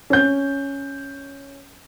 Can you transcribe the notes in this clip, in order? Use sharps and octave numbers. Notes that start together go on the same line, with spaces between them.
C#4 G6